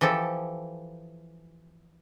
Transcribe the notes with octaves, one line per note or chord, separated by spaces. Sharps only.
E3 F3 G4 A4